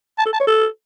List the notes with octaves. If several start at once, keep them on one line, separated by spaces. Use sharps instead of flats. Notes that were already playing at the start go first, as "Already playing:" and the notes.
A5
A4
A5
C#5
A4